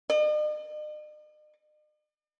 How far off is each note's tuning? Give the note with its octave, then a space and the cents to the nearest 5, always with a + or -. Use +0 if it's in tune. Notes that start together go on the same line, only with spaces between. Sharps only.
D#5 -45